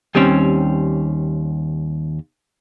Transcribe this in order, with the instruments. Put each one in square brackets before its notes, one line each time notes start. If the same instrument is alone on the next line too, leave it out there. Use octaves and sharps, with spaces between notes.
[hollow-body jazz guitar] D#2 G3 C4 C#4